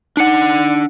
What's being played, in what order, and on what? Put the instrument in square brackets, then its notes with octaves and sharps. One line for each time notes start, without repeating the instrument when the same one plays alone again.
[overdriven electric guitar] D4 F#5 [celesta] D#4 C#7